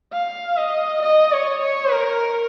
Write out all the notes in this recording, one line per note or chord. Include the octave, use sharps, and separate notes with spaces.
F5
D#5
D#5
C#5
C#5
A#4